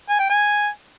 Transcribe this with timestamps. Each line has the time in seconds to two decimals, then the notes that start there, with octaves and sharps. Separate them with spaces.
0.10 G#5
0.20 G5
0.30 G#5